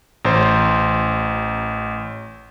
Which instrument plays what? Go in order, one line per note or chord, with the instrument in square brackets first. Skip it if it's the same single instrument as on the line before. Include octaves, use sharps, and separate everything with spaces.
[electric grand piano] A1 C5